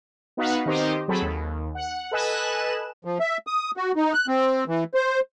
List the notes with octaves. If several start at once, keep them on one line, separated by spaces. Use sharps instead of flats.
B3 D#4 F#4 B4 F5 F#5
D#3 C4 D#4 G4 C5 D#5
F#3 C4 G#4 A4 B5
D#2
F#5
A4 B4 D#5 G#5 F#6 E7
F3
E5
D#6
F#4
D#4
F#6
C4
E3
C5